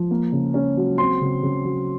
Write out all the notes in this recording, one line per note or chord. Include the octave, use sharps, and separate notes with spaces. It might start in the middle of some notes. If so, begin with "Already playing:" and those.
Already playing: F3
A#3
C#3
C#4
F#3
C4 C6
C#3
C#3
F#3